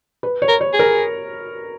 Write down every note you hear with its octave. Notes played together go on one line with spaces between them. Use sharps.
B4
C#5
A#4
C#5
G#4
A#4